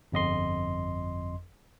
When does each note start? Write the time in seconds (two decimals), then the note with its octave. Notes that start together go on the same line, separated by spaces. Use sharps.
0.12 G1 F2 D#5 C6